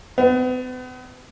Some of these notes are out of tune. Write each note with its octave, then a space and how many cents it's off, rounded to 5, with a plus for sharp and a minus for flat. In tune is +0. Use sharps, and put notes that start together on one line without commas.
B3 +40